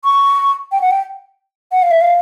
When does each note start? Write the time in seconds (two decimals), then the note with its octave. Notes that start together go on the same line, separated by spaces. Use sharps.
0.05 C#6
0.72 G5
0.81 F#5
0.91 G5
1.72 F#5
1.82 F5
1.91 E5
2.01 F5